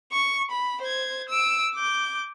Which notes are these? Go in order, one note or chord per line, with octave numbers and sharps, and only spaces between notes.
C#6
B5
C5 G#6
E6 D7
D6 G6